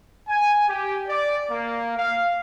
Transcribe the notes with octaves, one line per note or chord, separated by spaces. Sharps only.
G#5
G4
D5
A#3
F5